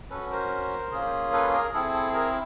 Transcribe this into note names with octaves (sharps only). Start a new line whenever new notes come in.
C#4 F#4 A4 B4
A#4 C5
A#3 C#4 F4 G#4
A4 B4
G#4 A#4
C4 E4 G#4 A4
A4
G#4 A#4